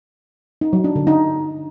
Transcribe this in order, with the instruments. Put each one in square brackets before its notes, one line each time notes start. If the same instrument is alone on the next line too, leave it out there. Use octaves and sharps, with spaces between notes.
[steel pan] D#4
F#3
D4
D3
D#4